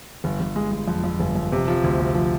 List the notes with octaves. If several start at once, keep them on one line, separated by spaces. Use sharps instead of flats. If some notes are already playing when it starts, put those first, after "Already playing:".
G1
G1
G#3
G#3
F2
F2
G1
F2
C3
F3
D2
C3
F3